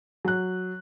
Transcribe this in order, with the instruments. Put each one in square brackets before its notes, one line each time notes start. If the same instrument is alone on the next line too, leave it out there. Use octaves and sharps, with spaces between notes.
[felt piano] F#3 F#6